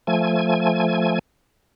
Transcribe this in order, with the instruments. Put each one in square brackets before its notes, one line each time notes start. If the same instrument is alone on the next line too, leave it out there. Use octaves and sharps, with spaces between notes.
[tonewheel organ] F3 A3 G#5